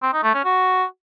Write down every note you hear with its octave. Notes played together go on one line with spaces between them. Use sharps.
C4
D#4
A3
C#4
F#4